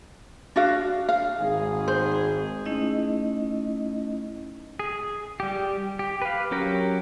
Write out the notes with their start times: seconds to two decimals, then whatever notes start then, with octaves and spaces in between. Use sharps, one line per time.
0.56 D4 F#4 F5
1.09 F5
1.39 G#1 G#2 G#4
1.88 C5
2.65 A3 C#4 D#4 E4 D#5
4.79 G#4
5.40 G3 G4
5.99 G4
6.22 B4 F5
6.51 F#3 C#4 G4 A#4